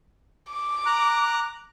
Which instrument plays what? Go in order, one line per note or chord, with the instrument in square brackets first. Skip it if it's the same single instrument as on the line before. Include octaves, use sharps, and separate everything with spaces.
[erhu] D6
[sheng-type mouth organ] A#5 F#6